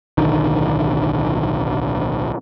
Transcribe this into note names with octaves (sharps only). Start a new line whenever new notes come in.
D1 B1 D3 D#3